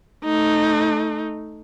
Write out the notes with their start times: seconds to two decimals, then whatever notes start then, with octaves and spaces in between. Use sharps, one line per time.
0.25 A3 D#4